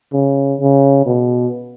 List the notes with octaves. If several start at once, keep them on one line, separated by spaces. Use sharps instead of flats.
C#3
C#3
B2